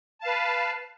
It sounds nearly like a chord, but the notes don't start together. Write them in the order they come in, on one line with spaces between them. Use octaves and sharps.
A5 F5 B4